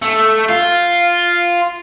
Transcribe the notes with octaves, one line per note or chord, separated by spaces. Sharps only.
A3
F4